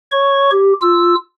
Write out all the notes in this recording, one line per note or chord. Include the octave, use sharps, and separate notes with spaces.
C#5 C#6
G4
F4 E6